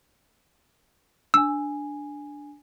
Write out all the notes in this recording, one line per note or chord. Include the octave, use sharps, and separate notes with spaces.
D4 G#5 E6